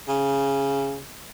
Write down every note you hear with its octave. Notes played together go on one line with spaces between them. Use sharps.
C#3